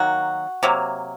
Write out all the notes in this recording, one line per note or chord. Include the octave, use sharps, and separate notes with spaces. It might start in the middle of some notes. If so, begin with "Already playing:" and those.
Already playing: D#3 F#3 A#3 F#4
C3 F#3 A#3